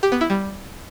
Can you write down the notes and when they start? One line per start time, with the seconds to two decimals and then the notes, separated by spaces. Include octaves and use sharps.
0.03 G4
0.12 B3
0.21 E4
0.30 G3